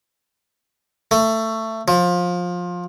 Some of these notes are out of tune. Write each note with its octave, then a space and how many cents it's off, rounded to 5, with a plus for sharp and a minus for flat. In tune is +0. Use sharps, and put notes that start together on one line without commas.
A3 +15
F3 +20